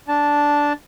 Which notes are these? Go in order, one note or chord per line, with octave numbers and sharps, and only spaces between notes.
D4 A5